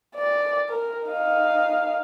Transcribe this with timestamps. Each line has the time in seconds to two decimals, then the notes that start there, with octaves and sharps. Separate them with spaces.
0.16 D5
0.69 A#4
1.08 D#4 F5